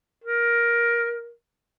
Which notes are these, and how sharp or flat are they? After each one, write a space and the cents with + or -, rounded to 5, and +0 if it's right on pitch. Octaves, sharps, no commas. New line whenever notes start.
A#4 +15